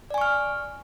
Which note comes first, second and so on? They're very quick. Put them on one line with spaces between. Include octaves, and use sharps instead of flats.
D5 G#5 C#6 F6